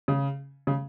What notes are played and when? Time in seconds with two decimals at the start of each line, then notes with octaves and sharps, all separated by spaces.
0.08 C#3
0.67 C#3